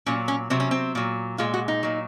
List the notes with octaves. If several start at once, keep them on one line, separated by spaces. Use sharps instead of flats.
A#2 F#3 C#4
C#4
C3 F#3 C4
C#4
C4
A#2 F#3
A#2 G#3 F4
F#4
D#4
A#2 F#3